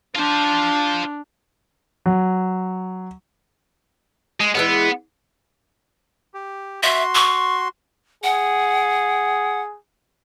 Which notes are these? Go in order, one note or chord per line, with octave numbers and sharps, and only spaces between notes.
D4 F4 C5
F#3
G#3
E3 G3 G#3 B3
G4
F#4 E5 C6
C#6
G#4 F#5